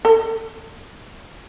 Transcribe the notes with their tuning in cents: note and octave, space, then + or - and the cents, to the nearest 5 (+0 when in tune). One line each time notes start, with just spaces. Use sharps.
A4 +25